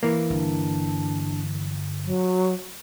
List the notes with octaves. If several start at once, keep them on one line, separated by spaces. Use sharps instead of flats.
E3 A#3
G1 D4
F#3